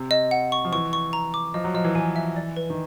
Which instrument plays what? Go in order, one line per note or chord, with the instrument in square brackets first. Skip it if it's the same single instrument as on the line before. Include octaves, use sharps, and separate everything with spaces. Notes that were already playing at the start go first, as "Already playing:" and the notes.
Already playing: [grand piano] C3
[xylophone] D#5
F#5
C#6
[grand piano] F3
[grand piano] E3 [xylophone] C#6
[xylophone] C#6
A#5
D6
[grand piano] F3 [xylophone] D#5
[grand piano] F#3
[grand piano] F3 [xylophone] D#5
[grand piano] E3
[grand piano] E3 [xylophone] G#5
[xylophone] E5
D5
B4
[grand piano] D#3